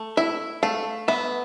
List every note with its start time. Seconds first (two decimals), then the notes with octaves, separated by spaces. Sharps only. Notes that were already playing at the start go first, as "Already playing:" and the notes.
Already playing: A3
0.17 E4 E5
0.63 A3 F5
1.08 B3 E5